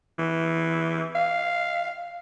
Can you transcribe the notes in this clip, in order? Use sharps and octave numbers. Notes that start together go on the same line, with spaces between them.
E3
F5